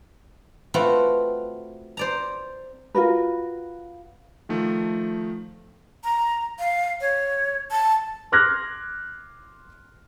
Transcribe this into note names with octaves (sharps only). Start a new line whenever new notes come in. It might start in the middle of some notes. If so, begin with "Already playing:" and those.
A3 C4 F4 F#4 B4
C5 D5 A#5
F4 F#4 A#4 B4
D#3 F3 A3
A#5
F5
C#5
A5
C6 D6 F6 F#6 G#6 A#6